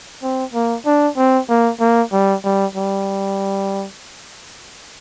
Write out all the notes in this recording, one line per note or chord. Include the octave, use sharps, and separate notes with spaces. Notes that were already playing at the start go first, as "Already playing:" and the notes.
C4
A#3
D4
C4
A#3
A#3
G3
G3
G3